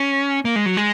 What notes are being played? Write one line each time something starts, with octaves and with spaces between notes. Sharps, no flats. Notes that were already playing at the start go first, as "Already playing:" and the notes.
Already playing: C#4
A#3
G#3
F#3
G#3